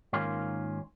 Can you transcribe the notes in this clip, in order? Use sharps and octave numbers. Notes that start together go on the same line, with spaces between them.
G#2 D#3 A#3 C#4 F4